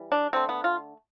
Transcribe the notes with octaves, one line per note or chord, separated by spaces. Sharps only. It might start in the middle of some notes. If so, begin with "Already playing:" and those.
Already playing: E3 G3
D4
D3 A3 C4
B3
F4